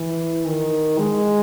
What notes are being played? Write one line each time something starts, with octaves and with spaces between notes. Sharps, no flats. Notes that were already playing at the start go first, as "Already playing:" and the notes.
Already playing: E3
D#3
G#3